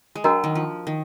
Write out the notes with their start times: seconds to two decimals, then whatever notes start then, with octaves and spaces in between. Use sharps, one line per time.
0.15 G#3
0.24 F#3 D4 F#4 A#4 D#5 A#5
0.44 D#3
0.55 F3
0.87 D#3